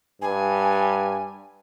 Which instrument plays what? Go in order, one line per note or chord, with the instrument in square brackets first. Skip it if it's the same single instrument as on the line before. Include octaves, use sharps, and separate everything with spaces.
[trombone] G2 [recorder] G#5